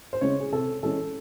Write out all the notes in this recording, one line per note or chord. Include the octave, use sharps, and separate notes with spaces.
C5
C#3 G#3 C#4 C#5
G#4
C3 A4
E3 G#3 C#4 A4